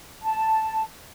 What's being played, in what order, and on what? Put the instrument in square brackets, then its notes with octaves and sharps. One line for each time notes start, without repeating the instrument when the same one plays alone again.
[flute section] A5